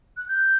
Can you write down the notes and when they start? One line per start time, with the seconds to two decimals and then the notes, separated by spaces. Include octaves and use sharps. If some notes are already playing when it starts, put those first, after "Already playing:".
0.17 F#6
0.28 G6